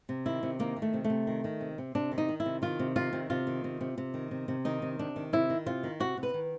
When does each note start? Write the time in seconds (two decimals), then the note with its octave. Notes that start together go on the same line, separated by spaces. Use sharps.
0.09 C3
0.26 D#3 E4
0.43 C3
0.59 D#3 A#3
0.76 D#3
0.82 A3
0.94 C3
1.04 A3
1.10 C3
1.27 D#3
1.44 D#3
1.61 C3
1.78 C3
1.95 C3 D4
2.12 D#3
2.18 D#4
2.29 D#3
2.40 E4
2.46 C3
2.62 D#3 F4
2.79 C3
2.96 D#3 F4
3.13 C3
3.30 C3 F4
3.47 D#3
3.64 C3
3.81 C3
3.98 C3
4.14 D#3
4.31 C3
4.48 C3
4.65 D#3 D#4
4.82 C3
4.99 C3 D4
5.16 D#3
5.33 C3 E4
5.50 D#3
5.66 C3 F4
5.83 D#3
6.00 C3 F#4
6.17 C3
6.23 B4
6.34 D#3